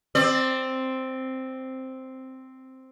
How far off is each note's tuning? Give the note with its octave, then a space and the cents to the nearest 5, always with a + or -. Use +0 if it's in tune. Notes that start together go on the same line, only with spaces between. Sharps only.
C4 +0 D5 +25